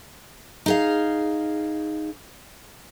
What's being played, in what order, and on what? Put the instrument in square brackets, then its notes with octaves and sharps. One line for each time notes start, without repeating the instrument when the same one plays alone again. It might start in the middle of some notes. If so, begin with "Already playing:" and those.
[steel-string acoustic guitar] D#4 G#4 F5